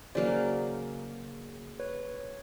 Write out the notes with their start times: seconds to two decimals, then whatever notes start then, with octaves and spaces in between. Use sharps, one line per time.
0.15 C#3 F#3 A#3 C5 D5
1.80 B4 C#5